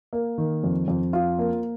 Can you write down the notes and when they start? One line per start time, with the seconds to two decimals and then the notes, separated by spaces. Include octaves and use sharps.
0.13 A#3
0.38 D#3
0.64 F2
0.88 F2
1.13 F4
1.39 A#3